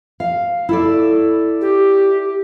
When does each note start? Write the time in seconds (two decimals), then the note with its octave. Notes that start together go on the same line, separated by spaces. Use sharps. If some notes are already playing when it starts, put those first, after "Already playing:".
0.20 F5
0.69 E4 A4 D5
1.61 G4